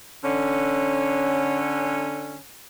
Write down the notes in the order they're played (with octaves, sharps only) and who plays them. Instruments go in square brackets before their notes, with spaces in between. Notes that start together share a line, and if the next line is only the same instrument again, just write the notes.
[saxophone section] D3 C#4